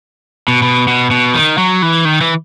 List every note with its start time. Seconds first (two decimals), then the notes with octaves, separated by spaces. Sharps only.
0.48 B2
0.63 B2
0.88 B2
1.11 B2
1.35 D#3
1.58 F#3
1.82 E3
2.05 D#3
2.21 E3